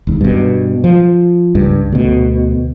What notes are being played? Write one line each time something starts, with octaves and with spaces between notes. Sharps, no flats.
E1 D#2
G2 B2
F3
C#2 G2
D2 B2